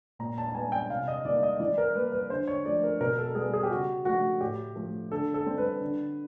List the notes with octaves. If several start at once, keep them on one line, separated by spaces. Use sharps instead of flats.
A#2 A#5
A5
A5
G3 B3 G#5
G5
C3 F5
D#5
D#3 G3 A#3 D5
D#5
E3 D5
A#4
G3 A#3 B4
B4
D3 C5
C#5
F3 A3 D5
A#4
B2 A#4
A4
G3 B3 G#4
G#4
G4
C#3 F#4
F3 A3 F#4
A2 G4
F3 A3
D3 A4
A4
G3 C4
B4
D3